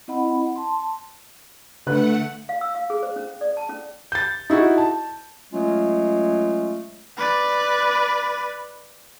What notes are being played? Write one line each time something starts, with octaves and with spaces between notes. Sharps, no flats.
C4 E4 D#5 F#5 B5
A5 C6
D3 A3 B4 F#5 F#6
F5
E6
F5
G#4
C5
C#4
D5
A5
C#4
G6 A6
D#4 E4 F#4 G#4
A5
F#3 G#3 A3 C#4 F4
B4 D5